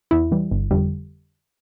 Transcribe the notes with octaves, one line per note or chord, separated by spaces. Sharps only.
E2 E4
E3 G3
G1
F2 D3 G3